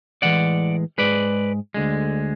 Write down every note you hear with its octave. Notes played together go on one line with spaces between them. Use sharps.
A2 E3 G#3 D5 F#5
G#2 G#3 B4 D5
D2 D3 G#3